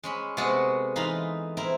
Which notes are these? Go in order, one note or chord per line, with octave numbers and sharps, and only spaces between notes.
G#3 C#4 B5
C3 G#3 B3 F#4 G#4 A4
E3 D#4 F4 F5 B5
C4 E4 A#4